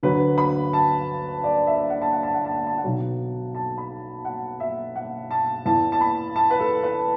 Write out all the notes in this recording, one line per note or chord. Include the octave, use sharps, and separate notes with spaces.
D2 D3 F#3 B4
B5
A5
D5
E5
F#5
A5
F#5
A5
F#5
A5
F#5
A5
F#5
B1 B2 F#3
A5
B5
F#5
E5
F#5
A5
E2 E3 A5
A5
B5
A5
B4
A4
B4